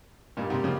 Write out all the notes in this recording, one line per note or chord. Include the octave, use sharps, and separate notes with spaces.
G2 A#2 G3 A#3 D#4 G4
G#2 C3
C#3 F3